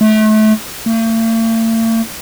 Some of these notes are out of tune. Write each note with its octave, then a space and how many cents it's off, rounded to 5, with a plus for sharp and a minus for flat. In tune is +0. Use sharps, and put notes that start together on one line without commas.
A3 -30
A3 +45